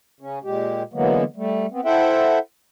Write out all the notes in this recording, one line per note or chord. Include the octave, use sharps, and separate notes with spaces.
C#3 C#4
A#2 G#3 G4
D3 E3 F#3 G#3 A#3 B3
G3 A3
B3 C4
E4 A4 C5 E5 F#5 G5